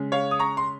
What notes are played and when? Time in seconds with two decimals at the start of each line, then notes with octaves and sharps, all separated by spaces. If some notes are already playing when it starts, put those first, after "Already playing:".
Already playing: C#3 G#3
0.12 C#5 F5
0.31 D#6
0.39 A#5 C#6
0.57 C6